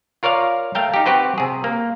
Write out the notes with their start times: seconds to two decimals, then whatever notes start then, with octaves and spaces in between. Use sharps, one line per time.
0.23 F4 A#4 C#5 D5 F5
0.75 A3 F5 G5 A#5
0.94 D#4 G4
1.06 C4 F#4 G4 B4 C5
1.38 C3 G#4
1.64 A#3